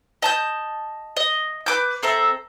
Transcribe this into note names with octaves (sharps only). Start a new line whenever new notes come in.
D#5 A5 G6
D#5
B4 D6 G6
C4 A4 E5 A#5